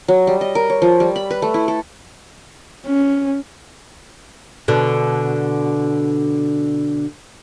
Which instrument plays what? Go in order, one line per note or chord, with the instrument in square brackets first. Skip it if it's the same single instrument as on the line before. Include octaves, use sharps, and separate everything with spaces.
[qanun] F#3
G3
D#5
A#4
C#5
F3
G3
B5
B4
A3
E4
A4
[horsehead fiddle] C#4
[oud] B2 D3